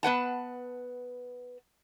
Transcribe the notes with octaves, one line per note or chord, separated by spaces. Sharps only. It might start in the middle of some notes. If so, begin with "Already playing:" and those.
B3 B4 F#5 A5